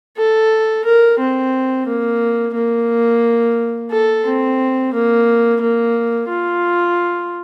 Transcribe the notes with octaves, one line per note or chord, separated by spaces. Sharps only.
A4
A#4
C4
A#3
A#3
A4
C4
A#3
A#3
F4